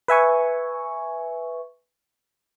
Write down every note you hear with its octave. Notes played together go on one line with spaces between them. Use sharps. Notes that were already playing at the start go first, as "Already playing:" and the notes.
B4 E5 G#5 C#6